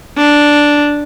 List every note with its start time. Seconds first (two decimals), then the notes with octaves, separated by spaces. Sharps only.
0.17 D4